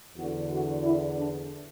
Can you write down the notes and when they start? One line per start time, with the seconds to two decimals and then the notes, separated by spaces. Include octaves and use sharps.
0.17 E2 D3 F#4
0.50 F#4
0.84 E4
1.17 D4